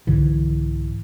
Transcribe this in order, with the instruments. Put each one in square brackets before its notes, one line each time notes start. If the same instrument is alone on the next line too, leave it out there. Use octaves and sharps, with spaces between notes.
[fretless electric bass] C2 G#2 D3 E3